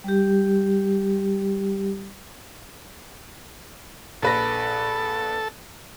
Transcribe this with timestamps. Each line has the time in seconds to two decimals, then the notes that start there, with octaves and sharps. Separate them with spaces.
0.04 G3 G4
4.22 A#1 A4 B4 A#6